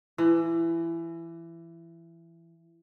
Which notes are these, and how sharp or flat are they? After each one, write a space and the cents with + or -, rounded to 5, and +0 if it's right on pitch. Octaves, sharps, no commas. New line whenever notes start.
E3 +20